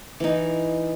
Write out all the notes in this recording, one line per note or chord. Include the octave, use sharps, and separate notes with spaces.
E3 D#4